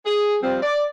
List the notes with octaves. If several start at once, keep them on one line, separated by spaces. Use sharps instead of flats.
G#4
F3 G3 C4
D5